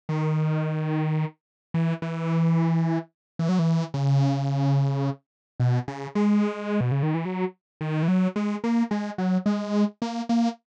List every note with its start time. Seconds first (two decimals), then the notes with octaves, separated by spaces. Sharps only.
0.09 D#3
1.74 E3
2.02 E3
3.39 E3
3.49 F#3
3.59 E3
3.94 C#3
5.60 B2
5.88 C#3
6.15 G#3
6.81 B2
6.92 C#3
7.03 D#3
7.14 E3
7.25 F#3
7.81 D#3
8.03 E3
8.08 F#3
8.36 G#3
8.64 A#3
8.91 G#3
9.18 F#3
9.46 G#3
10.02 A#3
10.29 A#3